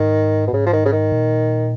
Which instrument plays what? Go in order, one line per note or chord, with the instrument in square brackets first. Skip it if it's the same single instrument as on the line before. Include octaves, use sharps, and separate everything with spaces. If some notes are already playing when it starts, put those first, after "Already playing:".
Already playing: [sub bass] G#2 [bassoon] D#3
[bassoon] B2
[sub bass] G#2 [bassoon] C#3
[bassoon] F3
D#3
C#3
D#3
[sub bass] A#2